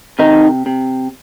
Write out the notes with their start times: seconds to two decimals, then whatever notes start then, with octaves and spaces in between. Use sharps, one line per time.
0.19 C3 D#3 D#4
0.66 C3